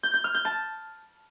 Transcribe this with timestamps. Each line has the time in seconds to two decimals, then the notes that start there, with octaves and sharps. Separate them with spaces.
0.03 G6
0.14 G6
0.24 F6
0.35 G6
0.45 A5